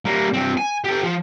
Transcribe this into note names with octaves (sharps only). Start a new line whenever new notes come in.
G3 A#3
G2 C4
G#5
G4 A4
F3